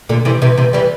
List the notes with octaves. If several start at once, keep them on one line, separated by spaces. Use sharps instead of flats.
A#2 D3
C3 E3
C3 E3
C3 E3
E3 G3